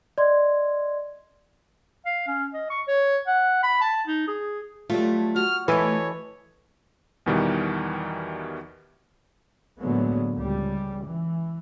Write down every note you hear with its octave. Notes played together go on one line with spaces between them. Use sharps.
D5 D#5 C6 G#6
F5
C#4
D#5
C#6
C#5
F#5
B5
A5
D#4
G#4
F#3 G3 A3 F4
F#4 F6
E2 E3 A3 E4 A4 B4 C#5 D#5
E2 B2 D#3 E3 G3
A2 D3 F#3 G#3 A#3 B3
C#2 G3
E3